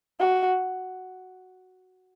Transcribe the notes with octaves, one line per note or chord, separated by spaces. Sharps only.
F#4